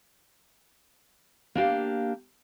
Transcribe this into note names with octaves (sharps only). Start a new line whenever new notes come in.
A#3 D4 G4 F5